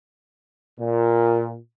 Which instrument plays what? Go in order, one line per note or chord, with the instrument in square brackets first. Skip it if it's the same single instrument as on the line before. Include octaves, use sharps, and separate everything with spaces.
[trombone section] A#2